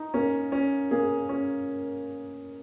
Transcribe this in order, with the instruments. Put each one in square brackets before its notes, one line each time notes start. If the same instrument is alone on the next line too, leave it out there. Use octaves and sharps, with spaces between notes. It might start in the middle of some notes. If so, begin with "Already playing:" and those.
Already playing: [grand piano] D#4
[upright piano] A#3 [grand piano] C#4
[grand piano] C#4
[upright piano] A#3 [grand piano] G#4
[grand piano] C#4